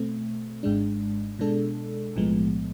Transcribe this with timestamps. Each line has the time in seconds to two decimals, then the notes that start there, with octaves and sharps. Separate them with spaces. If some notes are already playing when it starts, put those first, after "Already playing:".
Already playing: B2 A3 C4
0.63 G#1 G#2 G#3 D4
1.39 B2 G#3 D4 A4
2.16 B1 A2 F3 G#3 B3